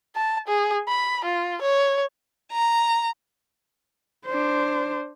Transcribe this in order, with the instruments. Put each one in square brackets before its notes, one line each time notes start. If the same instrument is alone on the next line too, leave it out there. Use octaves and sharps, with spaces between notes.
[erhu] A5
G#4
B5
F4
C#5
[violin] A#5
[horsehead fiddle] D4 C5